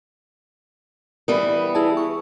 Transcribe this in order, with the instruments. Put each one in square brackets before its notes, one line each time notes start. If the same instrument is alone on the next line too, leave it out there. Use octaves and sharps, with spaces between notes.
[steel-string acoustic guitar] E3 G3 B3
[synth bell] E4 G#4 A5
C#6